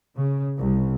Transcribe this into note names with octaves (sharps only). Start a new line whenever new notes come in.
C#3
C2